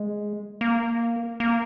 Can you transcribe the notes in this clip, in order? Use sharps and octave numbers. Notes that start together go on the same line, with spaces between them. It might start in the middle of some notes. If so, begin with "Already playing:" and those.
Already playing: G#3
A#3
A#3